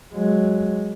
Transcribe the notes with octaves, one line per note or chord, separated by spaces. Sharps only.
F#3 G#3